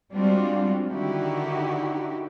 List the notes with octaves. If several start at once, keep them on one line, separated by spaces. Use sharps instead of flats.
G3 G#3 C4 D4 F4 F#4
D3 D#3 D#4 E4 F#4 G4